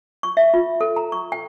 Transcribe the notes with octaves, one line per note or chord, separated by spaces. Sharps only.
C#6
E5
F4
A4
A#5
C#6
G5